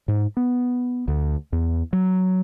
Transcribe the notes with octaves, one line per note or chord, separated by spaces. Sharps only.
G#2
B3
D2
E2
F#3